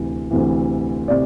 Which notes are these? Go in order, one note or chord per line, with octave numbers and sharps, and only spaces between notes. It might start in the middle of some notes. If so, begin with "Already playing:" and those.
Already playing: D2 C3 E3
D2 C3 E3
C3 D5